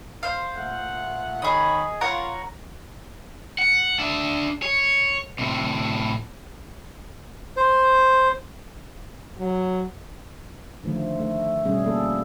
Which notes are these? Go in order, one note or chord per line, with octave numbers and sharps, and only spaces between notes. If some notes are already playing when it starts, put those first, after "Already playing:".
C5 F5
A#2 A3 F#5
D#3 G#4 C#5 D#5 B5
F4 A#4 C#5 F#5
F#5
D4 E5
C#5
A2 C3
C5
F#3
D3 D#3 F3 A3
A3
B2 G3 C#4 G#4
A#3 A4